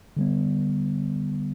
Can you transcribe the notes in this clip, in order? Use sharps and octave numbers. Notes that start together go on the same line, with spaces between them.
D3 G3 B3